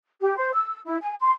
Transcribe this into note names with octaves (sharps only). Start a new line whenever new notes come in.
G4
C5
E6
E4
G#5
C6